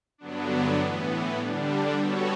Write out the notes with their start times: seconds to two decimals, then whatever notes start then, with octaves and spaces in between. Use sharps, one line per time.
0.18 G2 D3 F#3 B3 D4
0.78 A2 E3 B3
1.36 D3 G3 D4
1.95 G3 B3 F#4 A4 C#5